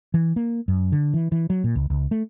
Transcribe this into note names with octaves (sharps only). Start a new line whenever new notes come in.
E3
A#3
F#2
D3
E3
E3
F#3
A#2
C#2
C#2
A3